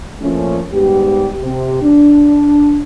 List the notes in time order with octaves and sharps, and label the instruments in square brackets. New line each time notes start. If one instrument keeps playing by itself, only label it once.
[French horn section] A#2 F3 A3 C#4
G#2 G3 B3 G4
C3 G4
D4